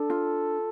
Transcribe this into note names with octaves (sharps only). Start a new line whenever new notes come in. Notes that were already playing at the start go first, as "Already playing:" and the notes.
Already playing: D4 A4
F4